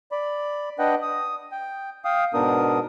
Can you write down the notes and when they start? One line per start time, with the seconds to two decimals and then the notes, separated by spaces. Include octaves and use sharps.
0.12 D5 B5
0.79 D4 B4 D#5 F#5 G5
1.02 D#6
1.52 G5
2.05 F5 G5 D#6
2.34 G#2 B2 B3 D4 A#4 D#6